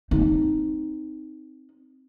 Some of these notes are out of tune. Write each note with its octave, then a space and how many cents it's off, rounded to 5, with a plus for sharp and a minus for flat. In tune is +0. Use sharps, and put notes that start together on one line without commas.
C4 +0 D#4 +0